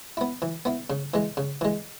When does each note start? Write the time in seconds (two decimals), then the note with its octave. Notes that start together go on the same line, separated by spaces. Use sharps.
0.17 B3 E4
0.42 E3
0.65 B3 E4
0.90 C#3
1.14 E3 G#3
1.37 C#3
1.61 E3 G#3